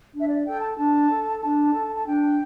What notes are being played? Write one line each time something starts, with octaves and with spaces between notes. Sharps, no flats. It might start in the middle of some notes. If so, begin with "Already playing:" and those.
D4
E5
D5
A4 G5
A5
D4 A5
A4
D4 A5
A4
A5
D4 G5